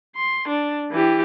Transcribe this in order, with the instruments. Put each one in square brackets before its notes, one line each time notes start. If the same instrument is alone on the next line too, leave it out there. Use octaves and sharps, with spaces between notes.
[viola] C6
D4
E3 G4